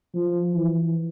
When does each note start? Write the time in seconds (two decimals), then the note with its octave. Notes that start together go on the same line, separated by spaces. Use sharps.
0.14 F3
0.54 E3